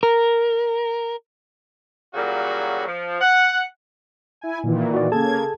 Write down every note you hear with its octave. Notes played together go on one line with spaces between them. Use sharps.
A#4
A#2 C#3 F#3 G3 F#4
F3
F#5
E4 G#5
A#2 D#3 E3
F#4 D5
C#3 A#3 G#4 A4 A5 G#6